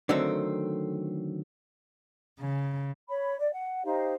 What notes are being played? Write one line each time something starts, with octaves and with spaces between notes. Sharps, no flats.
D3 D#3 F#3 A3 C4
C#3
C#5 B5
D5
F#5
D#4 G4 C5 F5